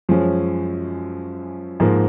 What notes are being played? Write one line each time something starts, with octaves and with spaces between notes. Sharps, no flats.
F#2 F3 G#3 C#4
G#2 F3 A#3